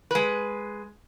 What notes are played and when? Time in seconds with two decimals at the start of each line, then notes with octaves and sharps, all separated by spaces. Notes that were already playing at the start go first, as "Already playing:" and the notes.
0.11 G#3 B4